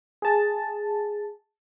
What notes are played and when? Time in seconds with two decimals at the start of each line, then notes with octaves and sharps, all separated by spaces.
0.22 G#4 A5